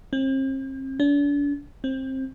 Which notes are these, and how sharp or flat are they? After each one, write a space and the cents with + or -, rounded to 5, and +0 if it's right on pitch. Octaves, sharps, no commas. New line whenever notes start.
C4 +40
D4 -40
C4 +20